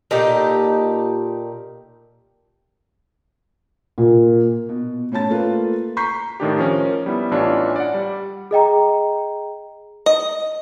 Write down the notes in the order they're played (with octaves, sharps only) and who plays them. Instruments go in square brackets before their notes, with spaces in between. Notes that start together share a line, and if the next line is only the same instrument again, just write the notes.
[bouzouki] A#2 D#4 G4 A4
[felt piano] A#2
B2
A2 C#4 C#5 A5 A6
A3 A#3 F4 B4
A#5 C#6 G6 B6 C7
[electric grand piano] A2 D#3 D4 G4
F3 C#4 A#4
G3 B3 E4
A1 E3 D4 F4 C#5
D5 F#5
G3
[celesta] G#4 D#5 G5 A#5
[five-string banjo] D#5